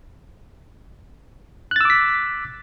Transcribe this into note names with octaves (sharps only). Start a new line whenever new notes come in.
D6 E6 F#6 A6 B6